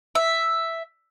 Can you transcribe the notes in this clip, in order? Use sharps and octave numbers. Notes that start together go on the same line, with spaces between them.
E5